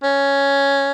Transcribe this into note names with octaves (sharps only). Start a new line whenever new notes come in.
C#4